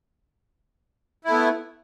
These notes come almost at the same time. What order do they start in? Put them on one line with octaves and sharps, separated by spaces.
E4 A3 B3